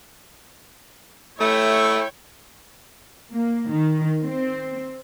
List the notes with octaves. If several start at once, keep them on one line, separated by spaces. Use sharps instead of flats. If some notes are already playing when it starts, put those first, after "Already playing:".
A3 E4 C#5 E5 G5
A#3
D#3
C4